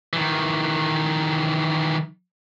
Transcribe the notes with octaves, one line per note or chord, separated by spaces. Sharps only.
D#3 E3